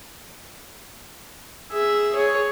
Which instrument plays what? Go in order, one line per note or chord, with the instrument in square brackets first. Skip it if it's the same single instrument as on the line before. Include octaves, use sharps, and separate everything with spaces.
[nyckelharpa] G#4 E5
G#4 C#5